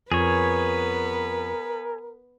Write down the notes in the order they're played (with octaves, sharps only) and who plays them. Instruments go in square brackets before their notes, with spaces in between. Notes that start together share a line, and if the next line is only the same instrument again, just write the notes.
[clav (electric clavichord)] F2 [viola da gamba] B3 B4 [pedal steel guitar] G#4 C#5 [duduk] A#4